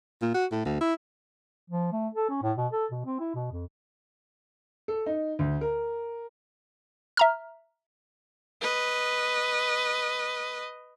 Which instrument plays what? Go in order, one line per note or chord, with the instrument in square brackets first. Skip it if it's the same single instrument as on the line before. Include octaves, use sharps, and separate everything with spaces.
[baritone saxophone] A#2
F#4
A2
D2
E4
[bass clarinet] F3
A3
A4
C#4
A2
B2
A4
B2
C4
E4
B2
F2
[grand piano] A4
D#4
D2
A#4
[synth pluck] E5 A#5 F6
[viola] B4 D#5